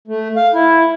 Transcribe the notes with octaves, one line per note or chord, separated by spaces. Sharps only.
A3
F5
E4